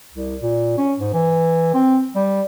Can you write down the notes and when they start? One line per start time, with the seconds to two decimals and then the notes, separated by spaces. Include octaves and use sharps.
0.13 C2
0.42 A#2
0.78 C#4
1.00 G#2
1.13 E3
1.74 C4
2.15 G3